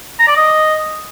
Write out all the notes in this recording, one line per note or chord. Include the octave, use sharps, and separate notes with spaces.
A#5
D5
D#5